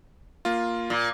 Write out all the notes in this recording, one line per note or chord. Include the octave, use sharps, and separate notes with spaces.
A#3 F4
A#2